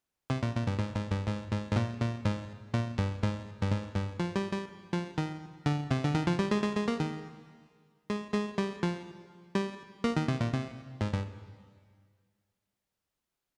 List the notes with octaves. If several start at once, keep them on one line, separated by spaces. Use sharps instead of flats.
C3
A#2
A#2
G2
G#2
G#2
G2
G#2
G#2
G#2
A#2
A#2
G#2
A#2
G2
G#2
G2
G#2
G2
F3
G3
G3
F3
D#3
D3
C3
D3
D#3
F3
G3
G#3
G#3
G#3
A#3
D#3
G#3
G#3
G3
F3
G3
A#3
D#3
C3
A#2
C3
G#2
G2